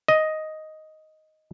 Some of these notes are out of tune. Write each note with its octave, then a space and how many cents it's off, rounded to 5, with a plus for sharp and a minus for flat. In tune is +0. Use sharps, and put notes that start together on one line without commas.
D#5 +5